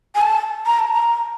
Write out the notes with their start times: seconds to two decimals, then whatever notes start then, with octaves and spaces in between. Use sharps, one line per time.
0.15 G#5
0.21 A5
0.66 A#5
0.79 A5
0.92 A#5